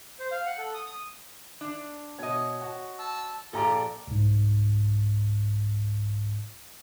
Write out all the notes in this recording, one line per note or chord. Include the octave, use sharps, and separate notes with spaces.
C5
F5
F#5
A4
D#6
D#6
D4
B2 C#5 D#5
F#4
A5 E6
A#1 F4 G4 A4 D5 A#5
C2 G#2